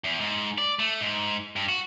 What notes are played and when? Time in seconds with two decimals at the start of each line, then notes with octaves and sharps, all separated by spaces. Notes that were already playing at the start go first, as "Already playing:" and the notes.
0.04 E2
0.20 G#2
0.58 D5
0.79 A3
1.01 G#2
1.56 G2
1.69 F#4